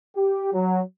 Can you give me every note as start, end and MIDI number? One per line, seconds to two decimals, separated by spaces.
0.15 0.51 67
0.53 0.81 54